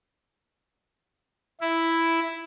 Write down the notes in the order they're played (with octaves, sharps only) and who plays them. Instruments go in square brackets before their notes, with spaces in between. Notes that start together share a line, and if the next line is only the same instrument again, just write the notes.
[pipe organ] E4